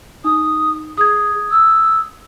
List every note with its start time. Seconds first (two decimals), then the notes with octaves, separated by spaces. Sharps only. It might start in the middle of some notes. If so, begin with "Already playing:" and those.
0.24 D#4 D#6
0.97 G#4 D#6 G#6
1.51 E6